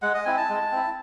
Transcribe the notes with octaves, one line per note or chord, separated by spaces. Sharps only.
G#3 F#5
D#5
C4 E4 G#5
A5
G#3
C4 E4